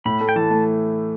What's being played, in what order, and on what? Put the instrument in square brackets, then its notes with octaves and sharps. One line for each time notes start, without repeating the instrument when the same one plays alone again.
[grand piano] A2 [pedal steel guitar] B5
[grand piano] A3
[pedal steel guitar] G5
[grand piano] E3 [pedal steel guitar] A5
[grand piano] A3